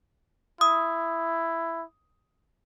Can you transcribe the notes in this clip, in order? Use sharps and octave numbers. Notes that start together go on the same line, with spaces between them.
E4 D#6